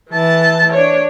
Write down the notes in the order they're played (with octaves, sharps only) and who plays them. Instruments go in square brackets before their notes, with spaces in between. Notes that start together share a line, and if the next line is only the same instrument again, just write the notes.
[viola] E3 A5
D4 C#5